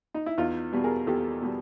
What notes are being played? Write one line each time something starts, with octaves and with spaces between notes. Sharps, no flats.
D#4
E4
E2 D#4 F4
B2 G3
G#4 A#4
E2 G4 A4
B2 G3